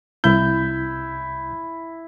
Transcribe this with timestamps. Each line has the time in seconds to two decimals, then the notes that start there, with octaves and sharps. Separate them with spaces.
0.24 C2 E4 G6